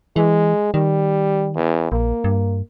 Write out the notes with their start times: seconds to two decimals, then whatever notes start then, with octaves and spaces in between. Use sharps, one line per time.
0.16 E3 G#3
0.74 D#3 G3
1.55 E2
1.92 A#1 A#3
2.24 G2